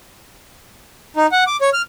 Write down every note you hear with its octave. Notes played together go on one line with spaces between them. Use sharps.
D#4
F#5
D6
C#5
F6